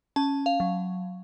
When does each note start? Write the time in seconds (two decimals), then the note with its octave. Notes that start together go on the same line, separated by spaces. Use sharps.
0.16 C#4 A5
0.46 F5
0.60 F#3